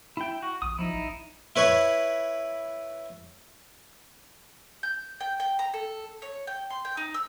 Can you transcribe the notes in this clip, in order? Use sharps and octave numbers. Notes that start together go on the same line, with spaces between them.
E4 G5
F#4
A#1 D#6
F3 D#4 E4
A1
E4 B4 C#5
G6
G5
G5
A#5
A4
C#5
G5
C6
G5
D#4
E6